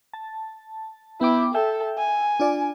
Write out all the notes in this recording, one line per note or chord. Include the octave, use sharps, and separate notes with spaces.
A5
B3 E4 G5 D6
A4 E5 G5
G#5
D4 F4 D5